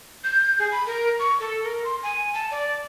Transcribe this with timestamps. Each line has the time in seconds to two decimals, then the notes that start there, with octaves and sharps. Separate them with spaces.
0.24 G6
0.59 G#4
0.71 B5
0.86 A#4
1.19 C#6
1.40 A4
1.64 A#4
1.84 C6
2.03 G#5
2.34 A5
2.51 D5